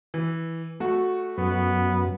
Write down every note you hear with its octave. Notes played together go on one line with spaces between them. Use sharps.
E3
A3 F#4
F#2 B3